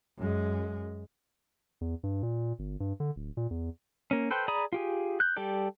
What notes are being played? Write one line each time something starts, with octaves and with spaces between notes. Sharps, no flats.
F#2 G#3
E2
G2
A#2
G1
G2
D3
D1
A#2
E2
A#3 C#4
A4 B4 C5 G5
G#4 D5 A#5 B5 D#6
F4 G4 G#4
F#6 G6
G3 G4 A4 D5